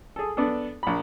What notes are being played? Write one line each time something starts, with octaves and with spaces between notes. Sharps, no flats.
G#4 A4
B3 D4 A4
A#1 B5